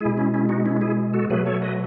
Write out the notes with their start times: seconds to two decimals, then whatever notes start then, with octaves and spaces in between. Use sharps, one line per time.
0.01 B2 G#3 E4 G#4
0.17 C#4 E4
0.34 C#4 E4
0.49 D#4 F#4
0.66 C#4 E4
0.81 E4 G#4
1.14 F#4 A4
1.30 B2 F#3 A3 G#4 B4
1.46 A4 C#5
1.62 B4 D#5